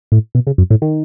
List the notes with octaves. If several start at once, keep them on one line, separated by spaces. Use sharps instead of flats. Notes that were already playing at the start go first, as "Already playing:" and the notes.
A2
B2
C#3
F#2
A2
D#3